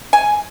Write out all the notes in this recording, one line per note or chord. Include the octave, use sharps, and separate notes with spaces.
G#5